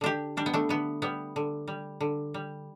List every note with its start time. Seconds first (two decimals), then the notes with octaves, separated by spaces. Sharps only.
0.01 D3 D4 G4
0.37 G3 D4
0.46 B3
0.54 A3 D4
0.69 D3 B3
1.02 G3 B3
1.36 D3
1.68 G3
2.01 D3
2.34 G3